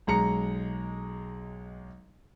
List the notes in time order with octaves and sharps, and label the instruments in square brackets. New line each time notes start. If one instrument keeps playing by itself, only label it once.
[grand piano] B1 G#3 A#5 C#7